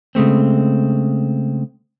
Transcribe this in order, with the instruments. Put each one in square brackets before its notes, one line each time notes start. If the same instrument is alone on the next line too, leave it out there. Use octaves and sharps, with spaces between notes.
[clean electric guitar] C#3 G#3 A3 C4